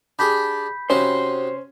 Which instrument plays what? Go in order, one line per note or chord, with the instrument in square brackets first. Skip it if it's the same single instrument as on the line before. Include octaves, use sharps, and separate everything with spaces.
[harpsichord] D4 G4 G#4 [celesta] B5 G6 B6
[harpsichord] C3 D#4 F#4 [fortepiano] C#4 [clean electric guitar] C5